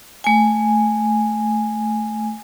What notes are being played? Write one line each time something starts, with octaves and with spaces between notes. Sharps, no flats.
A3 G#5